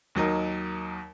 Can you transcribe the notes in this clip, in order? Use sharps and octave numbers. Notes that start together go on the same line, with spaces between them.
D#2 F#3 D#4 A#4